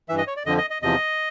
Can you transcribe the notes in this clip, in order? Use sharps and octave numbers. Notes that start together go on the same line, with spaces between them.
G2 E3 E5
D#5
C#5
D5
F2 D3 F3 D#5
D#5
D#5
E2 C3 F3 D#5